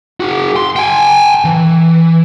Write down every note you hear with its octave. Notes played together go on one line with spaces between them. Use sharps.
F#4 G#4
C6
G5 G#5
E3